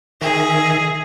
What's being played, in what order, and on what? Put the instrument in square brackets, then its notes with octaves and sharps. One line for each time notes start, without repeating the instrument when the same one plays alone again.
[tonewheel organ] D#3 E5 A#6 [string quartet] G#4